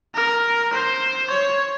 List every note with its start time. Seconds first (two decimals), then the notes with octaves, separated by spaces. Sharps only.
0.15 A#4
0.73 C5
1.30 C#5